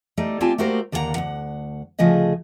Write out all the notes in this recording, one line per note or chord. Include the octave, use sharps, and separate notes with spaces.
G3 A3 D#4
C4 F4 G4 G#5 A5
A3 A#3 F#4 G4 A#4 C5
D#2 D3 A#3 F#4 F#5 A#5
D2 D#3 F#5
D2 C#3 F3 A3 G#4 D#5